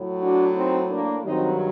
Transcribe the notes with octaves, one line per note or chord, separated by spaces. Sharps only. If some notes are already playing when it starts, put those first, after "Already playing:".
Already playing: A2 F#3
D4 F#4
C4 D#4
A#3 D4
G2 D#3 F#3 C4 D#4